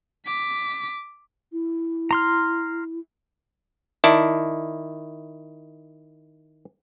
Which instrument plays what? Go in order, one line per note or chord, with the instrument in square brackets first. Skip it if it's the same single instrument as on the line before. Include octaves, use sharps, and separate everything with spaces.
[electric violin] D6 B6
[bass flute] E4
[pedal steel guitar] A#5 C6 F6
[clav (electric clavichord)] D#3 E4 D5 A5